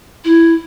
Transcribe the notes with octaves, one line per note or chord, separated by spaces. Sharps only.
E4